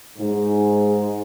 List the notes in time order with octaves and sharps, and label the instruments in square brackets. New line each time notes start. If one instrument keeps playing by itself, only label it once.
[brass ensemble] G#2